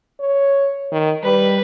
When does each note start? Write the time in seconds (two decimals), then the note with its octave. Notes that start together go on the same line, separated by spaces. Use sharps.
0.20 C#5
0.92 D#3
1.24 G3 B4